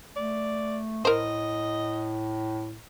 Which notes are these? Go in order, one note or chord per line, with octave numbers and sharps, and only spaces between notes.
A3 D5
A2 A#4 C5 D#5